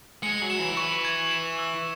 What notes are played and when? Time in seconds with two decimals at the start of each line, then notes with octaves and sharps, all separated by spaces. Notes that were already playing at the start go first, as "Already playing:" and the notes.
0.23 G#3 C#7
0.41 F#3
0.50 E7
0.59 E3
0.77 C#6
1.05 G#6
1.31 E7
1.59 E6